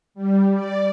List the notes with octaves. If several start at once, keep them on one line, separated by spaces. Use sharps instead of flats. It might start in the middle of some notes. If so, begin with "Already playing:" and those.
G3
D5